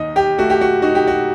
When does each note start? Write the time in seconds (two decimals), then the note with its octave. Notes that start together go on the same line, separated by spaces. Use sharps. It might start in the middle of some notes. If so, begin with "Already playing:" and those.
Already playing: D#2 D#4 D#5
0.16 G4
0.38 A3 F#4
0.50 G4
0.61 F#4
0.82 D#4 F#4
0.95 G4
1.07 F#4